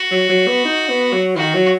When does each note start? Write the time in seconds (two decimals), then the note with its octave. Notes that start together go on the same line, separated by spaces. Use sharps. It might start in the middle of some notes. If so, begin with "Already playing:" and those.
Already playing: F#4
0.11 F#3
0.29 F#3
0.47 B3
0.65 D#4
0.89 B3
1.13 F#3
1.36 D#3 F#4
1.54 F#3